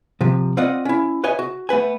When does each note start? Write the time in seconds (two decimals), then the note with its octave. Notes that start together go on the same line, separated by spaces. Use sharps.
0.21 C3 F3
0.57 C4 F4 D5 D#5 F#5
0.85 C#4 E4
1.24 B4 C#5 D#5 E5 G#5
1.39 F#4
1.69 A3 B3 B4 G#5